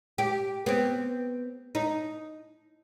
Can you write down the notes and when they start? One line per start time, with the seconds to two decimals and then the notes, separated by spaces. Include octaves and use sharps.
0.18 G4
0.66 B3 C4
1.75 D#4